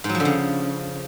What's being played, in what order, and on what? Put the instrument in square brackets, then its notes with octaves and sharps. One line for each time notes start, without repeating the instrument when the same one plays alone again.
[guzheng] G#2
F#3
F3
D3
C#3